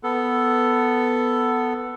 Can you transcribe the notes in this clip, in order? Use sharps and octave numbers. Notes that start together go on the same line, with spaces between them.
B3 A4